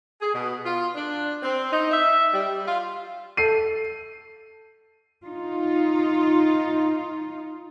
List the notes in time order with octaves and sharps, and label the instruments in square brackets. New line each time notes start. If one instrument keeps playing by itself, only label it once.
[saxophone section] G#4
B2
F4
D4
C4
D#4
E5
G3
F4
[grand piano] A4 C7 D#7
[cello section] D#4 F4